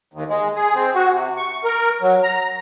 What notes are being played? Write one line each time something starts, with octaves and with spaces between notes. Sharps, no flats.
D#2
G#3
G#4
C4
F#4
C3
C#6
A#4
F#3
A#5